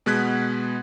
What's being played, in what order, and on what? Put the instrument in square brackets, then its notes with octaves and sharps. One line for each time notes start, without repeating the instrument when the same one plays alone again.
[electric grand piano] B2 G#3 B3 F#6 G#6 B6